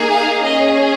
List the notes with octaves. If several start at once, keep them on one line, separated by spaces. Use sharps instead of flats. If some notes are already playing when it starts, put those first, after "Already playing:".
Already playing: A#3 D#4 G#4
F5
C#4 G#4 D#5